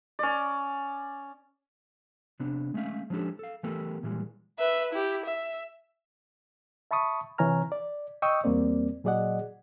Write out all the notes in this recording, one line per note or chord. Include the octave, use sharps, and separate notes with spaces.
C#4 D5
C3 B3 D4
G#3 A3 C#4 E5 F5
F3 G#3 C#4 D4 G4 A4
A4 F5
E3 A3 B3 G4 A4 A#4
A#2 E3 G3 G#3
B4 E5
E4 G4
E5
E5 A5 B5 C#6 D#6
C3 E3 C#5 G#5 A#5 F6
D5
D#5 G5 C#6 D#6 E6
E2 G3 A#3 C4 D5
A#2 F#3 G#4 D5 D#5 F#5